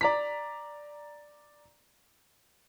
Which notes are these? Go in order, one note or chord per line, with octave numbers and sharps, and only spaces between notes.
D5 A#5 B6